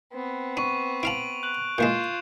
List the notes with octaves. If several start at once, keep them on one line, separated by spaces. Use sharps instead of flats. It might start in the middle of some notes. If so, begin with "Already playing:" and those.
B3 C4
D4 C#6 D#7
E4 F5 A5 D7 F7 F#7
F#6 F#7
A#2 E3 G#3 F4 G6 C7 E7